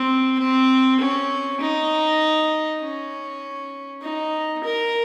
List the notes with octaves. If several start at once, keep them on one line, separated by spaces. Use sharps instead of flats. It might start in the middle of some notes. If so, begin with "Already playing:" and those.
Already playing: C4
C4
C#4
D#4
C#4
D#4
A#4